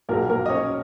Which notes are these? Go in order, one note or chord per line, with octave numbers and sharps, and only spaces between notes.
B1 A#2 G#3 A#3 A#4
A#3 A#4
D#5
C#4 C#5